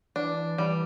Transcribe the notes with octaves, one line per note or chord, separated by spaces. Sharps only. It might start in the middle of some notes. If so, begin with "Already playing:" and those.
E3 D4
E3 G3